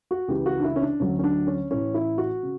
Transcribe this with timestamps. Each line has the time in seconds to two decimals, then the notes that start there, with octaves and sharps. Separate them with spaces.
0.11 F#4
0.28 C#2 C#3 E3 G4
0.46 F#4
0.60 D4
0.64 E4
0.76 C#4
0.82 D4
1.00 D2 D3 F#3 C#4
1.19 C#4
1.24 D4
1.47 C#4
1.70 A1 A2 E3 C#4
1.94 E4
2.18 F#4
2.43 C#3